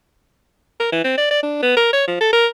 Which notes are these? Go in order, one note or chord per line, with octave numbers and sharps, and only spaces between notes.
A#4
E3
C4
D5
D5
D4
B3
A#4
C#5
F3
A4
A#4